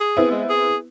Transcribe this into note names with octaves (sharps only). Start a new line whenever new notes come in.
G#4
B3 C4 E4
G#3
G#4